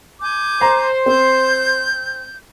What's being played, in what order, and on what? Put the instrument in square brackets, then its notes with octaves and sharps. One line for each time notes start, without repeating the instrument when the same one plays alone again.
[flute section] G#5 D6 G6
[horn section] C5 [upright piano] A#5
[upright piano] C4 [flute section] G6